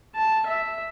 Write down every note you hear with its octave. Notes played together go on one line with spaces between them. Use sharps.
A5
E5